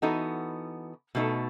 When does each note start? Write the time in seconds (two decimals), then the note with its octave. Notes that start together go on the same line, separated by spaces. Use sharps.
0.02 E3 B3 D#4 F#4 A4
1.15 B2 A3 D#4 A4